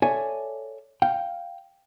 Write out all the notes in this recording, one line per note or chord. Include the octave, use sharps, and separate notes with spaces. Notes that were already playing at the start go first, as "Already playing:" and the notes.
A4 C#5 D5 E5 G#5
F5 G5